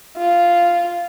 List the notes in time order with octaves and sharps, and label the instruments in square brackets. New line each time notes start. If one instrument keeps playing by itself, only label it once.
[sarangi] F4